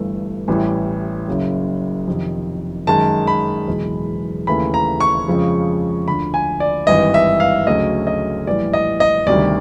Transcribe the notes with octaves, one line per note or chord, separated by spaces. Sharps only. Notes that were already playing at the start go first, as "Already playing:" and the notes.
Already playing: G1 G2 E3 A3
A1 A2 E3 G3
F#1 F#2 C#3 F#3
F2 C3 D#3
F#2 D#3 G#3 A5
B5
F#1 E2 B2 G#3
D#2 C#3 E3 A3 B5
A#5
C#6
F2 C#3 F3 G#3
D2 D3 F3 B5
G#5
D5
G#1 G2 E3 D#5
E5
F5
D2 C#3 F#3 A3 D#5
D#5
A#1 A2 E3 G3 D5
D#5
D#5
D2 C3 D#3 G3 D5